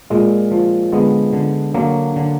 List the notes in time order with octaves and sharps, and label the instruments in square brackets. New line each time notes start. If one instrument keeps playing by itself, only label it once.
[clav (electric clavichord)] A#2 G#3
F3
D3 G#3 B3
D3
D3 F#3 A#3
D3